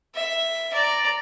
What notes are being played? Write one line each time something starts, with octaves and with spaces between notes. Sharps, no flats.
E5
D5 A#5